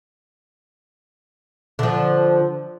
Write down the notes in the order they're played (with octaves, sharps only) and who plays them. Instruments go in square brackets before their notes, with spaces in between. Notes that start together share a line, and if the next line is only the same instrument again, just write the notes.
[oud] D3 F3